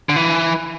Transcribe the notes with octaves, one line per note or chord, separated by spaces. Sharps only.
D3
E3